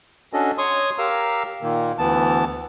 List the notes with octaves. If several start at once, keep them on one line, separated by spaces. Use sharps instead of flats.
C#4 D4 F#4 A4 D#5
C#5 C6 C#6 D#6
G4 A#4 F5 A#5 E6
A#2 D#3 A#3
D2 E3 B3 A5